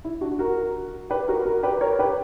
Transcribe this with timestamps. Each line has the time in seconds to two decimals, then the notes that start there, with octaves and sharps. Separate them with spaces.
0.05 E4
0.21 D4 F#4
0.39 F#4 A#4
1.10 G4 B4
1.28 F#4 A#4
1.45 F#4 A#4
1.63 G4 B4
1.81 A#4 C#5
1.99 G4 B4